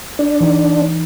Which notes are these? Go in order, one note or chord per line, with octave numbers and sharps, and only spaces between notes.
D4
E3 D#4